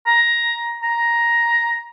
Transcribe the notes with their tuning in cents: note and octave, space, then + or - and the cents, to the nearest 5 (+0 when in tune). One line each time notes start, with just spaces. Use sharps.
A#5 +15
A#5 +10